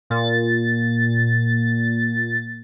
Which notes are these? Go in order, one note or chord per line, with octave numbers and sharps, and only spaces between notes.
A#2 A6